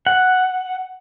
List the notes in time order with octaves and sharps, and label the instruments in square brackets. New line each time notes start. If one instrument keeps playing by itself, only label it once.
[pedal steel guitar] F#5